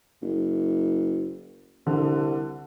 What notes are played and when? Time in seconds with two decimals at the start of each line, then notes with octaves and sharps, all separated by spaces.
0.22 F#1
1.87 C2 D3